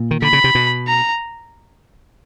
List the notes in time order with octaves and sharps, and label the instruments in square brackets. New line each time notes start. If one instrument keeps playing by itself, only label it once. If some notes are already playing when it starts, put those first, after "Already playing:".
Already playing: [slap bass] A#2
D#3
[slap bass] D3 [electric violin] B5
[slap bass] C#3
C3
B2
[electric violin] A#5